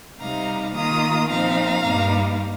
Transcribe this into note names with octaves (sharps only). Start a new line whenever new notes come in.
C3 G3 D#4 F5 A#5
D#3 A#3 F4 A#5 D#6
A#2 F3 C4 D#4 F5 A#5
G2 G3 A#3 D#4